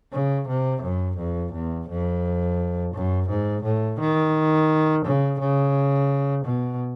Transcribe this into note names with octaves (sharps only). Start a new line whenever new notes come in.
C#3
C3
F#2
F2
E2
F2
F#2
G#2
A2
D#3
C#3
C#3
B2